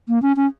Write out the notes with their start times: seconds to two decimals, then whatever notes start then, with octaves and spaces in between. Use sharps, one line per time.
0.08 A#3
0.22 C#4
0.36 C#4